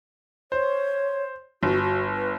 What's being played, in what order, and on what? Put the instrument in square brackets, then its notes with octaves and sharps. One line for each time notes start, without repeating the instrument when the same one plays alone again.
[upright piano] C5 [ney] C#5
[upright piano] G1 [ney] F#4
[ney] F#4
B4